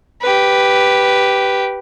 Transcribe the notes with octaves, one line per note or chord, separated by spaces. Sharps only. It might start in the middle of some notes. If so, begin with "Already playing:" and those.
G4 B4